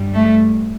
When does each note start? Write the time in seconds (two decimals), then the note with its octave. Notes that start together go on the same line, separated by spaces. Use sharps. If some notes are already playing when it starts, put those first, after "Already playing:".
Already playing: G2 G3
0.14 A3